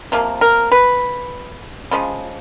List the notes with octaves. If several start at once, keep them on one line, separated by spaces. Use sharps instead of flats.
C3 F3 A#3
A#4
B4
C#3 F3 G#3